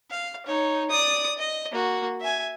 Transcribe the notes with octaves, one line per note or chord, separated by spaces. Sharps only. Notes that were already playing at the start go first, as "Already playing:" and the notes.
F5
D#4 C#5
D5 D#6
D#5
A#3 F#4
E5 G#5